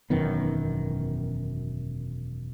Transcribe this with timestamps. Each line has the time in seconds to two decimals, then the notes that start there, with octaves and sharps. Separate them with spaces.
0.10 E1 F#2 D#3 B3